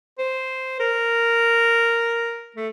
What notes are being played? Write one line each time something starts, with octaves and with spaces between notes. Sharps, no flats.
C5
A#4
A3